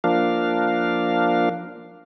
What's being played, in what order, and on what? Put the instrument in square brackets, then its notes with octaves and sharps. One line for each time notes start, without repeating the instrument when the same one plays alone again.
[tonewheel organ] F3 A#3 D4 F5